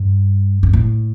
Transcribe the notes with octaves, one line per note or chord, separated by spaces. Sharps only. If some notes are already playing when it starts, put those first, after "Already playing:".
Already playing: G2
G2
A2